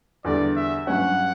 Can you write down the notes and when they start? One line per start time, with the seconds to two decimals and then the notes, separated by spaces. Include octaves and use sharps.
0.25 E2 D3 G3 D5
0.56 E5
0.87 G2 F#3 C#4 F#5